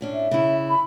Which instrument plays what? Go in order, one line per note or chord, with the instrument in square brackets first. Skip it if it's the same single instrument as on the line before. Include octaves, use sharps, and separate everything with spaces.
[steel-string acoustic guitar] A2 C#4 D4
[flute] E5
[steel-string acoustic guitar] C#3 E4
[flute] B5